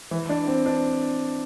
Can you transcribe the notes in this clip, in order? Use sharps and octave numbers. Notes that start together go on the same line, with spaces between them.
E3
D4
C4
D4